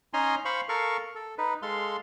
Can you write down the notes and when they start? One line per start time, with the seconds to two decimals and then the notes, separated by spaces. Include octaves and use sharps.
0.14 C#4 D#4 G#5 A#5 C6
0.45 C5 F5 B5 C#6
0.69 A4 A#4 F5 C#6
1.15 A4
1.38 D#4 B4
1.62 G#3 A4 F5 C6